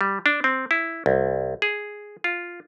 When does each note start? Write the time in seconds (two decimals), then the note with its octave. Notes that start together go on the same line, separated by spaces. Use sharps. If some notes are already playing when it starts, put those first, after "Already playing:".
0.01 G3
0.26 D4
0.44 C4
0.71 E4
1.06 C2
1.62 G#4
2.24 F4